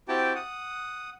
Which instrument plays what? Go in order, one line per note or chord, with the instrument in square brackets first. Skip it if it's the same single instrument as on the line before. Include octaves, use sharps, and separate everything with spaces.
[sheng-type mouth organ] C4 E4 F#4 G4 G5 A5
F#5 D#6